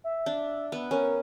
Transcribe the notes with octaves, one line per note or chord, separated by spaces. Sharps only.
E5
D4
B3
C#4 A#4